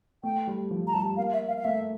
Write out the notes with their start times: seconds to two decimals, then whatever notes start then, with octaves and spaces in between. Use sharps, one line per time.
0.23 A3 G5
0.47 G3
0.71 F3
0.87 A#5
0.93 G3 A5
1.17 A#3 F5
1.33 E5
1.48 F5
1.58 F5
1.64 A3 E5